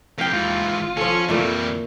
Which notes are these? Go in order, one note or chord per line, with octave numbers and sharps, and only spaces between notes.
F2 F5 G5
D#2 G#2 E3 F4
G#1
F3 C#4 A4
F2 A#2 E3 G3 A3 E5